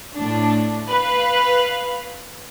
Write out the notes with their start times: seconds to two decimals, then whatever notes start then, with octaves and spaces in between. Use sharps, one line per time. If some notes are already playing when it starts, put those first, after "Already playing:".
0.16 A2 D4
0.91 B4 F5